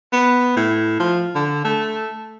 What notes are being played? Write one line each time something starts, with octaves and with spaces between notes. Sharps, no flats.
B3
A2
F3
D3
A3